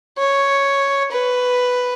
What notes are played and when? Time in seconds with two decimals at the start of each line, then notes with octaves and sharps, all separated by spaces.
0.18 C#5
1.12 B4